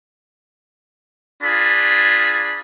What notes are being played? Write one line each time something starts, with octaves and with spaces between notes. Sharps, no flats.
D4 F4 G#4 B5